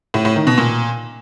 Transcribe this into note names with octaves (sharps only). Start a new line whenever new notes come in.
A2
A2
D#3
B2
A#2